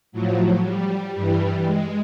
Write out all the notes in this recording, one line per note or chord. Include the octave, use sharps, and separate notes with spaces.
A2 F3 F#3
G3
G2 E3 G3
G#3